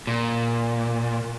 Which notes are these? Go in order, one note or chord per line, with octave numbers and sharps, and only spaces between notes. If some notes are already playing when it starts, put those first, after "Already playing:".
A#2